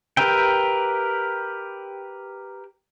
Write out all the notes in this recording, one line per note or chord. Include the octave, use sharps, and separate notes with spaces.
G4 A#4 B4 E5 G5